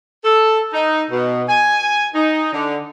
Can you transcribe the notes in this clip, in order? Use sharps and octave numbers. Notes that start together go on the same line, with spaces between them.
A4
D#4
B2
G#5
D#4
D3